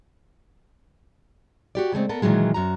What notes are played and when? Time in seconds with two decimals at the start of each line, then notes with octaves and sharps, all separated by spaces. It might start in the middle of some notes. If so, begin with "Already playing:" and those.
1.75 F#4 G4 D5
1.92 C#3 G#3 A3 C4
2.09 B3 A4 A#4
2.22 A#2 D#3 E3 F#3 G#3
2.54 F#2 F#4 A#5